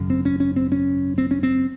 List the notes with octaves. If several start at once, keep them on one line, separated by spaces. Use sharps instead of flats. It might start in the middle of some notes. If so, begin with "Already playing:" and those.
Already playing: G#1 F#2 C#3
C4
C#4
C#4
C4
C#4
C4
C#4
C4